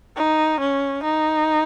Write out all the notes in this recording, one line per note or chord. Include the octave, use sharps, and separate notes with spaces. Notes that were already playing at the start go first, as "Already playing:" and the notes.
D#4
C#4
D#4